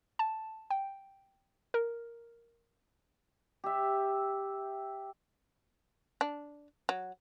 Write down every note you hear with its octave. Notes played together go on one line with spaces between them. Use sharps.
A5
G5
A#4
G4 E5
D4
F#3